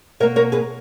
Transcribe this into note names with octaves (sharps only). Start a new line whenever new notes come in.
B2 A#3 A#4 C#5
A#4 C#5
G#4 B4